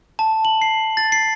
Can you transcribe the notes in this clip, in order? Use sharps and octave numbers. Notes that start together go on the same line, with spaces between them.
A5
F#7
C7
A6
C7